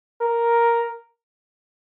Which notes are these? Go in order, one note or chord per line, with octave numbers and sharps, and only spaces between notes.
A#4